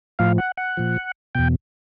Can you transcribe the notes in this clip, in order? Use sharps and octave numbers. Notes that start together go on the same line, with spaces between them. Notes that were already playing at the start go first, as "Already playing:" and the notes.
A2 F3 F5
F#5
F#5
A#2 F3
E2 B2 G5